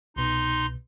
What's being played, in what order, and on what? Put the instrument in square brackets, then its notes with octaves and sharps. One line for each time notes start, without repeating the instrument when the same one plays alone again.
[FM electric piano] C2 B2 [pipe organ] D#4 C6